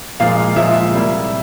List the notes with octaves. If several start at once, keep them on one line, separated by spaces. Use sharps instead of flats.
A#2 F3 G#3 F5
A#2 F3 G#3 E5
C3 G3 A#3 E4